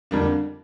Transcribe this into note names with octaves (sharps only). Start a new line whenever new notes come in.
F2 D3 G3 A#3 D4